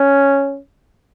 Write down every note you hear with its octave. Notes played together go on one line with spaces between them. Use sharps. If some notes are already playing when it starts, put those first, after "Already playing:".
Already playing: C#4